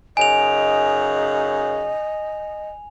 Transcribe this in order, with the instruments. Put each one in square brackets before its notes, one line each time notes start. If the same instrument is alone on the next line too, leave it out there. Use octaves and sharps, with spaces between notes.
[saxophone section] F#2 C#3 D#4 [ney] D#5 [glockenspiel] G#5 F7